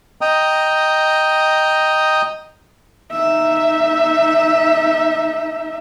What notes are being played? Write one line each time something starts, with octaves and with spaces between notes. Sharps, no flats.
D#5 G5 A#5 D#6
D#4 E5